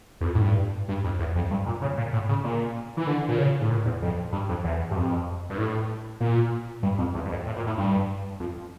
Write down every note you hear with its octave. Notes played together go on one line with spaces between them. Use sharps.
E2
F2
A2
G2
G2
F2
E2
F2
G2
A#2
C#3
A#2
A2
C#3
A#2
E3
D3
A#2
C#3
A2
A#2
E2
F2
G2
F2
E2
G2
F2
G2
A2
A#2
G2
F2
E2
G2
F2
A2
A#2
A2
G2
F2